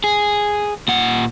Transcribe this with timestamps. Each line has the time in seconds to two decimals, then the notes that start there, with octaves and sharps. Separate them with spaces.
0.04 G#4
0.88 A#2 F#5